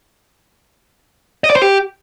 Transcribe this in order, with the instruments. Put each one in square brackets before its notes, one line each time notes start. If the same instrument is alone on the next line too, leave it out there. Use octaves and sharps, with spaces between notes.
[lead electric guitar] D#5
D5
C5
G4